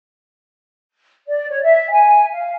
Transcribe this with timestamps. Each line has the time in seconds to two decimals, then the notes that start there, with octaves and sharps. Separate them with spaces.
1.27 D5
1.49 C#5
1.62 E5
1.91 G#5
2.33 F5